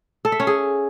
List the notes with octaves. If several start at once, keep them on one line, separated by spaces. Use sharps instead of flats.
A4
E5
C#4
G#4